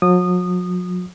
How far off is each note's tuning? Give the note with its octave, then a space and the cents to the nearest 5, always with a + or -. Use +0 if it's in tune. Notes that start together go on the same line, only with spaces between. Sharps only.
F#3 -45 D#6 -20